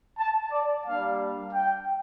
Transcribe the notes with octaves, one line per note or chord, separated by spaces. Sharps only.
A5
D5
G3 A#3 D4 F5
G5